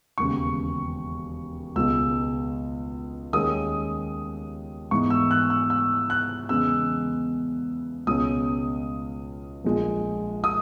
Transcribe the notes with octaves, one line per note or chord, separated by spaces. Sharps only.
E1 D#2 C#3 C#6
C#2 B2 G#3 E6
D#2 D#3 G#3 C#4 D#6
G#2 E3 B3 C#6
E6
F#6
E6
E6
F#6
E2 C#3 G#3 B3 E6
C#2 B2 G#3 C#4 D#6
A#1 A#2 G#3
D#6